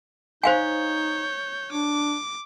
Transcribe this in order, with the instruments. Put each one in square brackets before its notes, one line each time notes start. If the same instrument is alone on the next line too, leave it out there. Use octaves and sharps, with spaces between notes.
[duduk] D#4 [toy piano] C5 F5 G#5 [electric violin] C#5 G6
[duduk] D4 [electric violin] D6